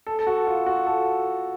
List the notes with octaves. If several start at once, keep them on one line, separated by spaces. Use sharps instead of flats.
A4
A4
F#4
F4
F#4
A4